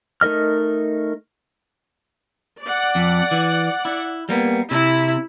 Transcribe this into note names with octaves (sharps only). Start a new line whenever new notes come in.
A3 D#4 A#4 D#5 F6
D5 F#5
F2
E3
E4
G3 A#3 B3
C3 E4